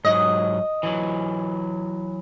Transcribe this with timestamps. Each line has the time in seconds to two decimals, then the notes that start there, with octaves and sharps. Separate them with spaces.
0.05 G#2 F#3 D#5
0.83 E3 F#3